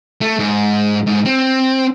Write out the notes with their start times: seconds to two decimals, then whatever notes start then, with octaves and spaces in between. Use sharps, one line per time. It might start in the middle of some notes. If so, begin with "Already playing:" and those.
0.21 A3
0.39 G#2
1.07 G#2
1.26 C4